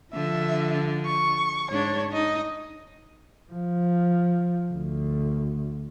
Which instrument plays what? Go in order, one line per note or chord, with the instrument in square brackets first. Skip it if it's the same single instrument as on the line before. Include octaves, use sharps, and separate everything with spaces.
[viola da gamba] D3 F3 [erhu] E5
[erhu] C#6
[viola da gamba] G#2 D4 [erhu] C#5
[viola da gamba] D#4 [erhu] D#5
[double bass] F3
D2